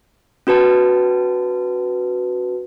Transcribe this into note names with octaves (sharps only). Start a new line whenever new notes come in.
C#4 F#4 B4 A5